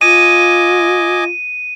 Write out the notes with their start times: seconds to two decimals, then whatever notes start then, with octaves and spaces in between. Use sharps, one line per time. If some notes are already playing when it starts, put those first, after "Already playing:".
0.01 F4 D#5 G#5 D6 D#7